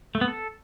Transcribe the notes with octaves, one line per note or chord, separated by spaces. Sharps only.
A3
B3
A4